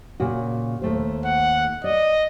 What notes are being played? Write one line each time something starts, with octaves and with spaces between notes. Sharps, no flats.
A#2 C#3 F#4
D#2 A3 C5
F#5
D5 D#5